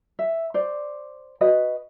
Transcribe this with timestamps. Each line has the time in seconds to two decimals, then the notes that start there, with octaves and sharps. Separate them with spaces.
0.19 E5
0.54 C5 D5
1.41 F#4 B4 D#5